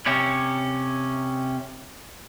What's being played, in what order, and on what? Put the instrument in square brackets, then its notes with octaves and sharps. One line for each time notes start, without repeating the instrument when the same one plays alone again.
[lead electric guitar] C3 C#4